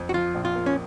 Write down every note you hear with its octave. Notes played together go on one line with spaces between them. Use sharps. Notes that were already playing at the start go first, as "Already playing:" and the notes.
Already playing: F2
F#4
F3 F4
A#1
F4
A#3
C#4